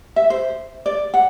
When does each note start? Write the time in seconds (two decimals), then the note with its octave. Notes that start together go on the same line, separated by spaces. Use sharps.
0.16 E5
0.30 C5
0.86 D5
1.14 F#5